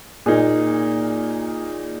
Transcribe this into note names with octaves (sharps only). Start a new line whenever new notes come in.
A#2 A#3 D#4 G#4